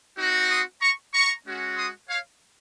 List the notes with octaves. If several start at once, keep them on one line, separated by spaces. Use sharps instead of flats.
C4 D#4 F#4
C6 D#6
A#5 C#6
A#5 C#6
G#3 C#4 F#4
C6 D#6
C#5 F5